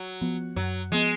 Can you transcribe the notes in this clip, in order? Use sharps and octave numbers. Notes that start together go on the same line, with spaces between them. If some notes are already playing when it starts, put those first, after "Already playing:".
Already playing: F#3
F3 B3
F#2 F#3
F3 G#3 B3